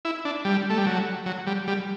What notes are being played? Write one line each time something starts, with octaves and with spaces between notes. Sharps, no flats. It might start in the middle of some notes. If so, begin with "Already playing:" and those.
E4
D4
G3
A3
G3
F#3
F#3
G3
G3